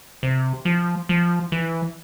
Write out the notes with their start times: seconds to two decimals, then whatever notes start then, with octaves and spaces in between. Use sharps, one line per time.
0.23 C3
0.65 F3
1.09 F3
1.52 E3